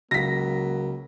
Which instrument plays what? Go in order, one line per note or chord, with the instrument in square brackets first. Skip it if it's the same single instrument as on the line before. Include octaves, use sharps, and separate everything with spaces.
[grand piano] C#2 [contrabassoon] F#3 [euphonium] A#3 [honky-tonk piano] A#6 B6